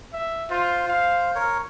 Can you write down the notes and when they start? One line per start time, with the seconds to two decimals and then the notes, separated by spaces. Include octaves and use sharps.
0.14 E5
0.50 F4 C5
0.88 F5
1.35 A#4 C#5